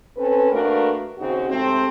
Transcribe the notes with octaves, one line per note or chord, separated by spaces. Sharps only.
C4 C#4 A4 B4
A3 A#3 D4 F#4 A#4 B4
D#2 C#3 C4 D#4 F#4
G#2 C3 A3 C4